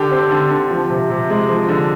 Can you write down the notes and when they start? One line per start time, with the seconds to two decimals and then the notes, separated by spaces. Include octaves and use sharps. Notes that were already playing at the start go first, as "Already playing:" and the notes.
Already playing: D3 G4
0.11 C4
0.31 D3
0.51 D3
0.70 F3
0.90 C3
1.10 C3
1.30 G#3
1.49 F3
1.69 D3